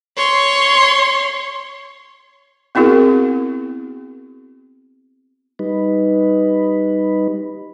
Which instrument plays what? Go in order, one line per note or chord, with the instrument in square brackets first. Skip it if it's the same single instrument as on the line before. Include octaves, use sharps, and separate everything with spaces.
[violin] C#5 C6
[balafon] B3 C4 E4 F#4 G#4 A#4
[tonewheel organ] G3 D#4 B4